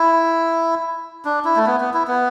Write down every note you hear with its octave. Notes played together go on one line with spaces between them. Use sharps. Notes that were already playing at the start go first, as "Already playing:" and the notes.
Already playing: E4
D4
E4
A3
B3
B3
E4
B3